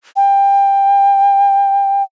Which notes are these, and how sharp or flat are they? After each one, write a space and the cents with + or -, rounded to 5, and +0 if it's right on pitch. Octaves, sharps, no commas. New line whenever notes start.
G5 +20